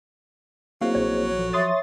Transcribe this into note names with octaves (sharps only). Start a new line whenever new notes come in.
F#3 A#3 C4 E4 G#4 C5 D#5 F5
A#1 C#5
F3 A4
C#5 E5 C6 C#6 D#6 A6